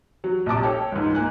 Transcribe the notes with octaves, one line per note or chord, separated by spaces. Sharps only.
F#3
A#1 C3 A5 D6
A4 C#5 G5
C#2 G#2
A#3 G#5 F#6